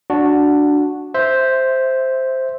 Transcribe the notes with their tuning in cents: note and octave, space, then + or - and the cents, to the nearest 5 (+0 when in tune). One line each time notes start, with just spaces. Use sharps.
D4 +0 F#4 -5
C5 +0 E5 -10